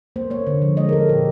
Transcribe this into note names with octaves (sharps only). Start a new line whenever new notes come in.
A#3 C5
A#3 C#5
D3
F3
G#3 D#5
A#4
G#3 A4
A#2 G4